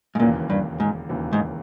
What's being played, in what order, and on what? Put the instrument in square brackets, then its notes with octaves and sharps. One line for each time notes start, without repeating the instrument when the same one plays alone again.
[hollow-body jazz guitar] G#2
[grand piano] E1 D#2 C#3 E3 A#3 [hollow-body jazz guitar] A#2
[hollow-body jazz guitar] G2
G#2
[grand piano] E1 D#2 C#3 E3 A#3
[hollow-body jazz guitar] G#2